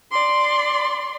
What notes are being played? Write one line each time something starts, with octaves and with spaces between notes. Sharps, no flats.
D5 C6